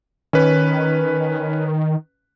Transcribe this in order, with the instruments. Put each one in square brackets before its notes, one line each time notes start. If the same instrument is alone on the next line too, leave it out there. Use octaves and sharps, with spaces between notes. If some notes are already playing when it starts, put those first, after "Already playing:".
[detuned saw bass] D#3 [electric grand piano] C#4 B4